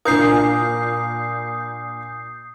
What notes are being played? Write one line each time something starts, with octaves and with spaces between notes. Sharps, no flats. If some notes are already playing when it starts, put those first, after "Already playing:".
A#2 D4 A#4 D#6 G6 C7